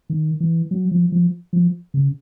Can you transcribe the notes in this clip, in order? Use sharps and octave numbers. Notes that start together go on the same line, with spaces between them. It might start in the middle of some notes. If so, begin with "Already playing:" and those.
D#3
E3
F#3
F3
F3
F3
C#3